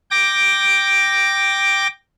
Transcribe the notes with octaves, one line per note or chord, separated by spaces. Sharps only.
G5 D6 A#6